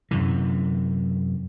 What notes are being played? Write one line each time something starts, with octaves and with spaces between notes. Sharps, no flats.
F#2 C3 E3